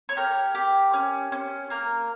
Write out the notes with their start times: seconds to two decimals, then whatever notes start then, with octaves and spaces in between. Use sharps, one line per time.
0.09 C#5
0.17 G4 A#4
0.55 G4
0.94 C#4
1.32 C#4
1.70 A#3 A#4